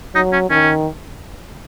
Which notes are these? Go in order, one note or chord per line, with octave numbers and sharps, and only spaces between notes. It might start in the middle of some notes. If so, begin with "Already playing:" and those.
F#3 D#4
C#4
D#3 C#4